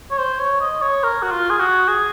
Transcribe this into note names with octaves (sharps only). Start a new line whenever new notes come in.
C#5
C5
C#5
D#5
C#5
A#4
F#4
F4
G#4
F#4
G#4